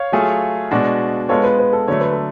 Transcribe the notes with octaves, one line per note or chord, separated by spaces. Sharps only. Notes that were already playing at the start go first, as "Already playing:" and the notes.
Already playing: C#5 F5
F#3 A3 F4 G#4
B2 G#3 D4 F#4
G#3 B3 F4 A4 C#5
B4
B4
A4
D3 F#3 A3 C#5
B4
A4